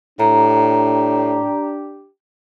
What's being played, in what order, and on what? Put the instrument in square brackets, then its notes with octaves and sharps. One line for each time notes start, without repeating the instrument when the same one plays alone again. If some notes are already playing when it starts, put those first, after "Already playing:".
[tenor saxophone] A2 [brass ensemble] D4 G4 [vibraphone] A#5